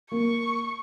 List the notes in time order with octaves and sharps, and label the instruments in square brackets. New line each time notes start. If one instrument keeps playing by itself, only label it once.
[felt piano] A#3 [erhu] C#6